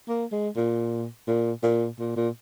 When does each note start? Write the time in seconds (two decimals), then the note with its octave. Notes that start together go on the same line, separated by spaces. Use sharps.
0.09 A#3
0.32 G#3
0.56 A#2
1.27 A#2
1.63 A#2
1.99 A#2
2.16 A#2